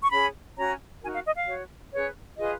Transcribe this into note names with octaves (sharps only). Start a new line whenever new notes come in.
C#6
C#4 G#4 C#5 B5
C#4 F#4 C#5 A#5
D#4 F#4 A#4 G#5
F5
D#5
F5
F#4 C#5
C#4 G#4 B4 C#5
F4 G#4 B4 D#5